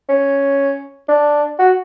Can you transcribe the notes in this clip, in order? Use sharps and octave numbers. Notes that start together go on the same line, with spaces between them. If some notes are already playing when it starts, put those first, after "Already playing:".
C#4
D4
F#4